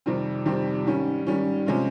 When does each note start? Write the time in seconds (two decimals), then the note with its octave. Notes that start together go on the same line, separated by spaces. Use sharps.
0.06 F2 C3 D#3 G3 C4
0.46 F2 C3 D#3 G3 C4
0.86 G#2 D#3 G3 C#4
1.27 G#2 D#3 G3 C#4
1.66 C3 F3 G#3 C#4 F4